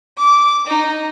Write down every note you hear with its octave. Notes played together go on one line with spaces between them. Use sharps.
D6
D#4